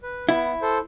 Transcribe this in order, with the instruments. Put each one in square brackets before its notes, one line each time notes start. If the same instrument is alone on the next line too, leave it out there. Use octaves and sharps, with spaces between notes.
[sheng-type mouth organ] B4
[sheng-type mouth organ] B3 [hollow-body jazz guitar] E4
[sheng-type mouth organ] A4 C5